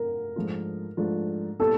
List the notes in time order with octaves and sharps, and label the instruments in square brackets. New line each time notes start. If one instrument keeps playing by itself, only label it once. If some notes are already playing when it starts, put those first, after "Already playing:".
Already playing: [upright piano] A#4
[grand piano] G#2 F3 A3 D4 F4
G#2 F3 A3 D4 F4
[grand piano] A#2 G3 B3 E4 [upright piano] A4